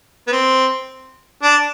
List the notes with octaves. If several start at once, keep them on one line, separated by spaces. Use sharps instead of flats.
B3
C4
D4